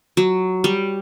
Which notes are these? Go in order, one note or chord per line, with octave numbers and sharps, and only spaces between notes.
F#3
G3